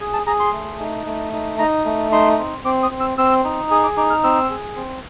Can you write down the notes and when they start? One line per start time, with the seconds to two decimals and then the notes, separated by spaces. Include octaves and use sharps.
0.01 G#4 G#5
0.13 A5
0.27 G#4 A#5
0.40 C6
0.53 A3
0.80 D#4
1.06 A3
1.33 D#4
1.59 D#4 A#5
1.85 A3
2.12 D#4 C6
2.38 C4
2.64 C4 D6
2.83 D#6
2.91 C4
3.00 E6
3.18 C4 E6
3.44 D#4
3.71 G#4 D#6
3.84 D6
3.97 D#4 D6
4.10 F6
4.24 C4 E6
4.50 G#4
4.76 C4